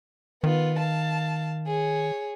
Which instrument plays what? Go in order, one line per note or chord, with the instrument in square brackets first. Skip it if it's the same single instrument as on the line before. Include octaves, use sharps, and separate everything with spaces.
[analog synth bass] D#3 [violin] B3 F4
[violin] F5 A5
G#4 C#5